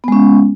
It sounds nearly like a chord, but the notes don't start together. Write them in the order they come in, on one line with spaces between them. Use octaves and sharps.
B3 G#3 C#4